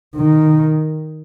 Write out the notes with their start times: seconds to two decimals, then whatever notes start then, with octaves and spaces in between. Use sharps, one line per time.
0.16 D#3